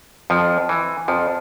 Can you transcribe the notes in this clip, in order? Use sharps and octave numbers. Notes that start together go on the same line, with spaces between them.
F2 F3
E3
F2 F3